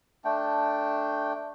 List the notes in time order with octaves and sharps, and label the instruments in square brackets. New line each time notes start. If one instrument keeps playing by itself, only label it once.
[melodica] A3 D4 G5